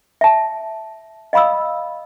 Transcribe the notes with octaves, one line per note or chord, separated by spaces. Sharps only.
E5 A5
D#5 F5 B5 D#6 E6